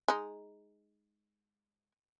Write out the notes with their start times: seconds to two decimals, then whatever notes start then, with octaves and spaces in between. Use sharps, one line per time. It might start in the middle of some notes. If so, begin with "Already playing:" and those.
0.08 G#3 D#4